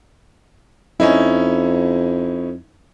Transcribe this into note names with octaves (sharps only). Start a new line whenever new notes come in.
F2 C#4 D#4 E4